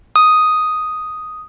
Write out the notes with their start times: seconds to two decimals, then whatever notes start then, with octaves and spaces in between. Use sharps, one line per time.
0.16 D#6